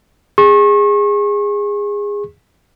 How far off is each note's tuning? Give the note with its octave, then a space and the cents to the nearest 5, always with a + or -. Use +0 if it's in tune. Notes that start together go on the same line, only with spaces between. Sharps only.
G#4 -20 C#6 -35